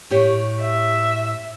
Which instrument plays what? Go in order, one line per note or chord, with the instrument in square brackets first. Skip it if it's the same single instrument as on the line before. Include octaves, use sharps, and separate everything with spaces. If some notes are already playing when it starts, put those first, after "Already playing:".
[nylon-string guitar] A2 G4 C#5
[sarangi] E5